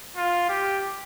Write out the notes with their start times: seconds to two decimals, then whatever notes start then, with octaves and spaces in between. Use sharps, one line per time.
0.17 F4
0.49 G4